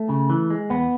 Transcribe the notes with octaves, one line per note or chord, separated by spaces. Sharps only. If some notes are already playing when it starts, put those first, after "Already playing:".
Already playing: A3
C#3
E3
G#3
E2 B3